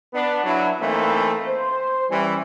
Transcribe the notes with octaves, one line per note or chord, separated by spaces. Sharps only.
B3 D4
F#3 D4 E4
E3 A3 A#3 C4 D#4 E4
C5
E3 G3 C#4